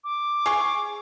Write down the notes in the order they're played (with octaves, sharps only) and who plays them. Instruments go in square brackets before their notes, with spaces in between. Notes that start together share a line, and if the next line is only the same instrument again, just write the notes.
[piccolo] D6
[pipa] G#4 C#6